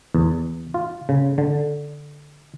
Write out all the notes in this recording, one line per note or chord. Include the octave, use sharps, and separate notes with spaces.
E2
F4
C#3
D3